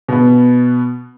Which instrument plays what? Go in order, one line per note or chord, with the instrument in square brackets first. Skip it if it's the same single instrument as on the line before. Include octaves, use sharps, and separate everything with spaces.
[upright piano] B2 B3